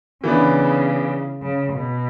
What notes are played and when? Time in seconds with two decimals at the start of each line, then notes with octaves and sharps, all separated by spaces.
0.24 C#3 E3 B3 D4
1.42 C#3
1.73 B2